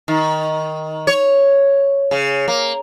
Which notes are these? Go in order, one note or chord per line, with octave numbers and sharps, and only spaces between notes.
D#3
C#5
C#3
A#3